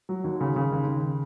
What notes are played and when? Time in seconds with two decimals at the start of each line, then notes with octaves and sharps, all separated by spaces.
0.09 F#3
0.24 D#2
0.41 C#3
0.56 C#3
0.72 D#2
0.87 C#3